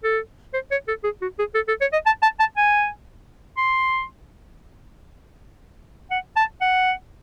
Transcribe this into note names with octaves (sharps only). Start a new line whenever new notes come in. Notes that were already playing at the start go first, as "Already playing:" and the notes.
A4
C5
C#5
A4
G#4
F#4
G#4
A4
A4
C#5
D#5
A5
A5
A5
G#5
C6
F#5
A5
F#5